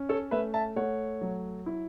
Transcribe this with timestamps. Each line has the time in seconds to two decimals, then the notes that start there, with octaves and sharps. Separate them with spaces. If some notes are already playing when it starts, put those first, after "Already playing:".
Already playing: C#4
0.09 A4 C#5
0.31 A3 B4 E5
0.54 E5 A5
0.76 A3 C#5 F#5
1.21 F#3
1.66 E4